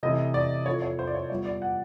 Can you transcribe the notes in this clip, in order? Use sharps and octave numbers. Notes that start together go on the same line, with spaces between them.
C3 E3 A3 C#4 E4 D#5
D5
A2 F3 A3 C4 E4 C#5
C#5
C5
D5
C#5
A#2 G3 B3 C#5
D5
F#5